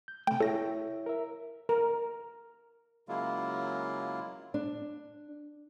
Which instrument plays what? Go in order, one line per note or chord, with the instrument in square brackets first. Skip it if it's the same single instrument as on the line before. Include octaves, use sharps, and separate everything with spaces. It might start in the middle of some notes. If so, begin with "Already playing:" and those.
[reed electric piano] G6
[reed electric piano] C3 A3 [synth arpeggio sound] G5
[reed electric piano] E4 C#5 E5 [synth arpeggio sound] A4 A#6
[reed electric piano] A#4 E5
[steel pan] A#4
[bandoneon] C#3 F#3 G#3 A#3 E4 F4
[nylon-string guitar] D4